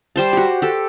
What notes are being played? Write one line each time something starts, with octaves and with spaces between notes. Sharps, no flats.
G3 C5 A5
F#4 G4
G4 A4